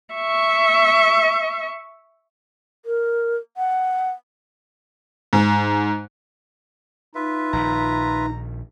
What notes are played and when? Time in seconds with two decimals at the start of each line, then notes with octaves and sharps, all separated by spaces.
0.14 E5 C#6
2.85 A#4
3.57 F#5
5.33 G#2
7.15 D#4 F4 B4 E5
7.53 A#1 D#3 A#5